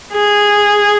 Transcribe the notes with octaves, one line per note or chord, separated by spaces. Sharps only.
G#4